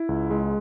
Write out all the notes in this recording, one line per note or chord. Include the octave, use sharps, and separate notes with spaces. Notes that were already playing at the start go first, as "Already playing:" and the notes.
Already playing: E4
C#2
G#3